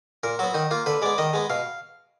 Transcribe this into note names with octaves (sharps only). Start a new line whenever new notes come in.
A#2 A#4
F#3 B3 F#4
D#3 D#4
A#3 F4
D3 B4
G#3 B3 D5
D#3 D#5
G#3 B3
B2 F5